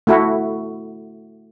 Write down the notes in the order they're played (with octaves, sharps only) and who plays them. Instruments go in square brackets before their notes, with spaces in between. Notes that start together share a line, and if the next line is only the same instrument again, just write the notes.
[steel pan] A3 E4 F#4